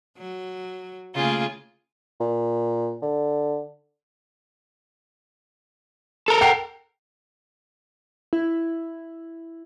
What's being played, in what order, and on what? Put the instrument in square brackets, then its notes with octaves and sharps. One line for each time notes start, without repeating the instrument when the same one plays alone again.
[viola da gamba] F#3
[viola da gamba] C#3 A3 A#3 [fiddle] F4 G#4
[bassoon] A#2
D3
[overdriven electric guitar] A4 A#4
[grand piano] F#5 G5 C7
[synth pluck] E4